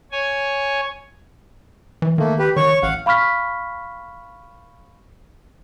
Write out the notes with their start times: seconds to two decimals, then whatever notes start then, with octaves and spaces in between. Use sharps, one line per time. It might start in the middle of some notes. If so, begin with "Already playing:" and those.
0.12 C#5 G#5
2.02 E3
2.18 D#3 A3 A#3
2.39 G4 B4
2.56 D#3 C#5 C#6
2.83 A1 F5 F#5
3.06 F5 B5 C#6 F6 B6